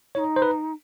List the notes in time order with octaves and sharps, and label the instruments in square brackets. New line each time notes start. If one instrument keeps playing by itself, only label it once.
[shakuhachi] E4 [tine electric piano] C#5
[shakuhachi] D#4
[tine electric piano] C5
B4